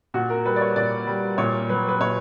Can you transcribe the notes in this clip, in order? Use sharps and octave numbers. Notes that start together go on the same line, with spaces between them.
A#2 F#4
A#4
G3 B4
D5
C#5
A#2 D5
G3
A#2 C#5
F#3 B4
B4
A#2 C#5